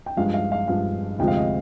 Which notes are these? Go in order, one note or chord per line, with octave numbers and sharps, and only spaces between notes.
G5
G2 F3 G#3 F5
F5
F5
G2 F3 G#3 F5
D2 C3 F3 G#3 G5
F5
D#5